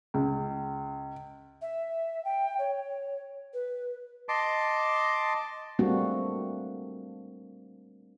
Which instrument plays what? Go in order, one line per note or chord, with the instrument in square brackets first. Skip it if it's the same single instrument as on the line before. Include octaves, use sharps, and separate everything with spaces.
[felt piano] C#2
[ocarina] E5
G5
C#5
B4
[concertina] D#5 A5 C6 D6
[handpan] G3 A3 A#3 C4 D4 F#4